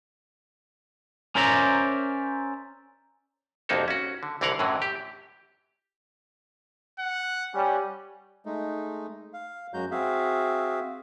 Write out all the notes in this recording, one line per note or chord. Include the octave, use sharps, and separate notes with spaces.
C#4 A#4 C5 D5 E5 A#5
C2 F2 A#3 D#4 F#4 A4
C#4 F#4
D3
C2 D3 E3 A#4 F5 F#5
F#2 A2 D3 E3 F#3
G4
F#5
G3 C#4 F#5
G#3 A3 D#4
F5
F#2 F#3 G#3 F#4 A#5 G6
C4 F#4 G#4 E5 F5